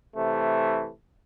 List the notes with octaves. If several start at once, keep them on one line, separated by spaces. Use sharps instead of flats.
C3 E3 A3